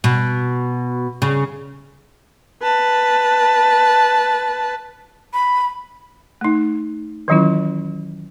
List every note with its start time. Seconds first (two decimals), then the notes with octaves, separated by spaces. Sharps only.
0.04 B2
1.22 C#3
2.63 B4 A5
5.33 B5
6.41 A3 D#4
7.28 D#3 E3 F#3 C#4 E4 F4